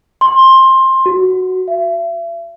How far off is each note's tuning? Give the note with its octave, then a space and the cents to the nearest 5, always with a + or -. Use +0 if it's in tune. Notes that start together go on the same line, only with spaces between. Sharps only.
C6 +15
F#4 +0
E5 +40